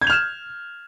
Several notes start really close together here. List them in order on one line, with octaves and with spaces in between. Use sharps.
G#6 G6 F7 F6 E7